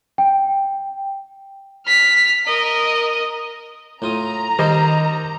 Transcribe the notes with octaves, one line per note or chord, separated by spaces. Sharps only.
G5
F6 B6
A#4 D#5
A2 F4 A#5 D#6
D#3 G3 D#4 C5 D#5 D6